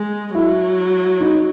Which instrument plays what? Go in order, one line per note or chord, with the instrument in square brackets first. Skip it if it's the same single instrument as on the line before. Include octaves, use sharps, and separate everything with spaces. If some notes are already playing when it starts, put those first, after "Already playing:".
Already playing: [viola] G#3
[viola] F#3 [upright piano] E4
[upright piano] D#4